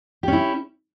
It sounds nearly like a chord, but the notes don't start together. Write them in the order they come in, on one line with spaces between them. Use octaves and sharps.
G4 C#4 E4